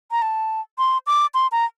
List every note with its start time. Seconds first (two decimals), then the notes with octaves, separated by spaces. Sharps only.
0.11 A#5
0.22 A5
0.78 C6
1.07 D6
1.34 C6
1.52 A#5